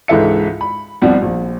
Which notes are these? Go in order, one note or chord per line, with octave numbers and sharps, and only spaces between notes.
C#2 G#2 E3 A4 E5 C#7
B5
C2 B2 F3 G3 F#5
A#1